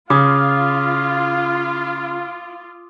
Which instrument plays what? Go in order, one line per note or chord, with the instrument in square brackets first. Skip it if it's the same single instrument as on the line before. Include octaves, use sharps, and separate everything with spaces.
[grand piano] C#3 [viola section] F4 [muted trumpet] F5 [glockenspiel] D6 D#6